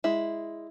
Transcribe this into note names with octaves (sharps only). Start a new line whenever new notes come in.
G#3 E4